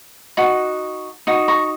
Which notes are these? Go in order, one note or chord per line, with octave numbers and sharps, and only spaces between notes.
D#4 F#4
D#4 F#4
A#5 C#6